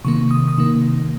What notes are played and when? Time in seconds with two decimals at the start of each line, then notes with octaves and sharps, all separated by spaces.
0.05 C3 D#3 A#3 C#6
0.31 D#6
0.48 D#6
0.58 C3 D#3 A#3